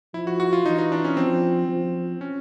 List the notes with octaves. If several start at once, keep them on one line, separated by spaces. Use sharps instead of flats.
F3 E4
F#4
F#4
F4
E3 D#4
D#4
D4
C#4
F3 C4
F3
C#4